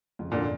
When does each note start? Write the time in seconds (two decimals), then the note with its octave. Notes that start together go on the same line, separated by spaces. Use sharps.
0.19 F2 C#3 F3
0.32 A#2 D3